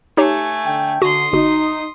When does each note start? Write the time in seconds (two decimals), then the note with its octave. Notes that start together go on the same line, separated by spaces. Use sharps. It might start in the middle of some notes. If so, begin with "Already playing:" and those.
0.17 A3 D#4 G4 C#5 G#5
0.64 D3 G5
1.02 D3 F#4 C6 D#6
1.33 G1 D#4 F#4